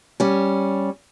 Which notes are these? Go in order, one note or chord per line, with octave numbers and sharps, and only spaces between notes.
G3 C#4